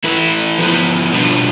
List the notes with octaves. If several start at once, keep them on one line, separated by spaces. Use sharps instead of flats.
A3 E4 B4
F3 B3 E4 B4
B2 G3 D4 F4 B4